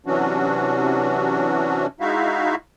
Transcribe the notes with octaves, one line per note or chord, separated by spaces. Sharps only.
C3 E3 F#3 C#4 D4 F#4
G#3 D#4 E4 F#4 E5 F5